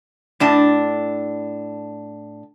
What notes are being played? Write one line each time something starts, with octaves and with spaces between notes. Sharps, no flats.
A2 D4 A5